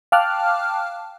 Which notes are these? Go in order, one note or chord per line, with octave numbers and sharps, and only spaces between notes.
F5 G5 A5 D6 F6 F#6